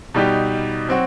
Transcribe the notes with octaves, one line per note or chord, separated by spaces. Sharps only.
B2 G3 D#4 G4
F#3 C4 F#4